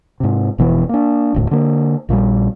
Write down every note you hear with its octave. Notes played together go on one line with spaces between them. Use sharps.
G#2 C3
F1 B2 E3 B3
A#3 D4
D#1 D2 A2
D3 A#3
A#1 A#2 F#3 G3